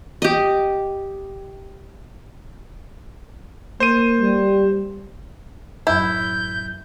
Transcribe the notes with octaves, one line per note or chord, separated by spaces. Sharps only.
G4 D#5
A#3 C5 D#7
G3
A1 F#2 E4 G6